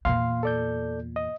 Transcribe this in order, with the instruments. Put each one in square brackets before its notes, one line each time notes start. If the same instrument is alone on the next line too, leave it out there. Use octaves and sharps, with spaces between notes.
[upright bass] E2 A#2 [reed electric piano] F5 C6
[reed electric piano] A4 D5 G6
D#5